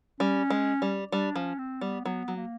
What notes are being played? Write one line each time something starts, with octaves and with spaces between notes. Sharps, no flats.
G3 C#4
G#3
G3
G3 D4
F3 C#4
C4
G3 B3
F#3 B3
F#3
A#3